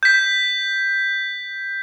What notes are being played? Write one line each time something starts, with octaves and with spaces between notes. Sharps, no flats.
G6 B6